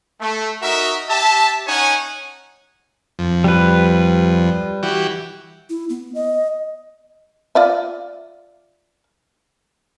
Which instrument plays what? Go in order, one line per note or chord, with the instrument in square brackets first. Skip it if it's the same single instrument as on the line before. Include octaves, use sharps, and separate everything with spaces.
[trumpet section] A3
D#4 F#4 A#4 E5
G4 E5 A5
C#4 D#4 C#5 F#5 G#5
[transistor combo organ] F2
[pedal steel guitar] G3 B4
[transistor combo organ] E3 F#4 G4
[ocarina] E4
B3
D#5
[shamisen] F4 D5 E5